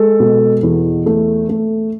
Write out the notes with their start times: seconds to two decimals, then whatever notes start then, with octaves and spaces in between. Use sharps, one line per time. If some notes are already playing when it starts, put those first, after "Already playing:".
Already playing: G#3 A4
0.20 B2
0.63 E2
1.06 A3
1.49 A3